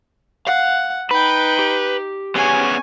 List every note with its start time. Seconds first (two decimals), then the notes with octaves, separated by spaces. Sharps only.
0.47 F5 F#5
1.11 D#4 B4 G5 B5
1.59 G4
2.35 B3 C#4 G#4 G#5 C#6